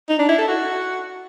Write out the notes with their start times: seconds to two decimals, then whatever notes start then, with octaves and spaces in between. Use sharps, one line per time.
0.09 D#4
0.19 D4
0.29 E4
0.38 A4
0.48 F#4